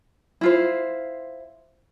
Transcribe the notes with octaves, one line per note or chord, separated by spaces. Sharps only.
E4 F4 C5